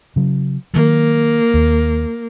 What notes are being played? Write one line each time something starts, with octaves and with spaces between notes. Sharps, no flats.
C#3 F#3
D#3 F#3 A#3
D#2